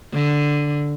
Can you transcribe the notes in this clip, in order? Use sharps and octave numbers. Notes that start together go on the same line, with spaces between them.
D3